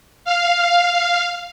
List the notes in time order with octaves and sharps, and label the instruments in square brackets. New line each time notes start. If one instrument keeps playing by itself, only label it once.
[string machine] F5